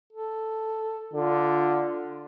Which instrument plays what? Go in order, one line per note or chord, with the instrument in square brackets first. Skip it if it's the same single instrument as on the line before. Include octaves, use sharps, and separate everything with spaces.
[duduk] A4
[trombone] D3 [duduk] F4